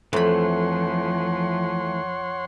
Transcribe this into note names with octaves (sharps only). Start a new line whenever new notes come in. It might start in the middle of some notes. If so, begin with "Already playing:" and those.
F2 E3 F3 A3 C#5 F#5 B5 C6